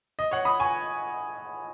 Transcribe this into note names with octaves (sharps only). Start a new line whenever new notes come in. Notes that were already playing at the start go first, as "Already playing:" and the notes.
D#5
C#5 F#5
B5 D#6
G#5 C#6